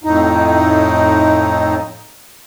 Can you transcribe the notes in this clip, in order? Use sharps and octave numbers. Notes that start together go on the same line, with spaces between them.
F2 A2 D#4